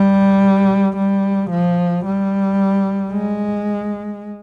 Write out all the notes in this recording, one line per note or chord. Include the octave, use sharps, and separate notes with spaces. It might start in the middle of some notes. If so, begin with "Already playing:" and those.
Already playing: G3
G3
F3
G3
G#3